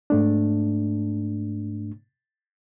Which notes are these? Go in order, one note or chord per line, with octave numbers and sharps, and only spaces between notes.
G#2 A3 D4